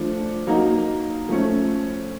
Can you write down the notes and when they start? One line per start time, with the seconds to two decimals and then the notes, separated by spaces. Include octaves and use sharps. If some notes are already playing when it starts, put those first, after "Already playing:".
Already playing: F3 A3 D4
0.47 F#3 A#3 D#4
1.29 F3 A3 C#4